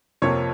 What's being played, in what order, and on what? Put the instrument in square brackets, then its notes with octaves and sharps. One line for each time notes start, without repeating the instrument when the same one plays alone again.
[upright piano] F2 C3 F3 A#3 C#5